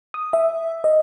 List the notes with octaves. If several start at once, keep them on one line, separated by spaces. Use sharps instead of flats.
D#6
E5
D#5